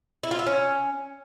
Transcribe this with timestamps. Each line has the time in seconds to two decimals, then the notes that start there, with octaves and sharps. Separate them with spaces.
0.23 E4
0.31 F4
0.39 E5
0.47 C#4